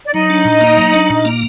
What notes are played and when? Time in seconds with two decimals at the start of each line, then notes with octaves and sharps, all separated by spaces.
0.05 D5
0.13 F#3 D#4 D#5
0.30 D4
0.45 A#2
0.61 A#3
0.77 F#3
0.94 D4
1.10 A#2
1.25 A#3